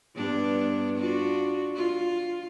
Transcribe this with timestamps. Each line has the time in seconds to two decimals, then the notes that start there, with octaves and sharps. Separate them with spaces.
0.15 G2 B3 D4
0.98 D4 F4 F#4
1.75 F4